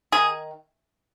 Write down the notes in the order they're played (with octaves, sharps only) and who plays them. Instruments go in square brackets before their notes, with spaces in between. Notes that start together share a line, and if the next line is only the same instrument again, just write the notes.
[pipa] D#3 G#4